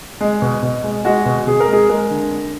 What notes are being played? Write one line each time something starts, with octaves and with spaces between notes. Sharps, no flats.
G#3
B2
B2
G#3
G#3 F#4
B2
B2 G#4
A#4
G#3 G#4
G#3 A#4
D3
D3